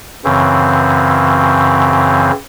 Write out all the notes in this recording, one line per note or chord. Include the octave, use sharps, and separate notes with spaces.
F#2 C#3 E3 C4